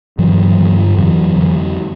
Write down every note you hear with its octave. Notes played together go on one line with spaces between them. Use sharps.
G2 D3 E3 F#3
G2 D3
F2 D3 E3 F#3
F2 D3